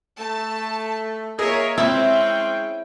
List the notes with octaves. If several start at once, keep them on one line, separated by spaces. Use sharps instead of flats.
A3 A5
A#3 G#4 A#4 C#5 D#5 E5
G#3 C4 C#4 E4 E5 G5